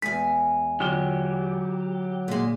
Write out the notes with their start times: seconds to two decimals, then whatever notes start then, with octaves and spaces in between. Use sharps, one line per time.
0.02 E2 G#3 G#5
0.80 D3 F#3 F4 G4
2.28 A#2 G#3